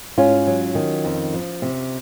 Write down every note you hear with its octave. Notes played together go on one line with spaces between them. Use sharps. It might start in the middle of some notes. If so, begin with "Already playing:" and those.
G#2 C#4 F4
F#3
D#3
F2
F3
C3